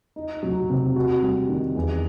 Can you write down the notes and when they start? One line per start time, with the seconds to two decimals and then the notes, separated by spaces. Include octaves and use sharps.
0.16 D#4
0.43 F#3
0.70 C3
0.96 F#4
1.23 G3
1.49 D#3
1.76 E2